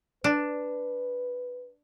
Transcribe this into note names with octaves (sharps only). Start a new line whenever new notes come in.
D4 B4